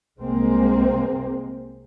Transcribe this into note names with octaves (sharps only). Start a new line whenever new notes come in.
C2 G#3 A#3 C4